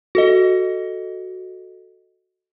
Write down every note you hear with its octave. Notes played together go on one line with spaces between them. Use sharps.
F#4 A4 D#5